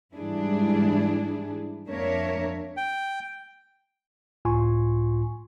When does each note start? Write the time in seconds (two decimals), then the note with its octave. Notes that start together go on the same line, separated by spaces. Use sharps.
0.13 G#2 E3 G3 D4 E4 G#4
1.87 F2 A#3 D4 A#4 C#5 E5
2.77 G5
4.45 C#2 A2 F4 G#5 C6 C#6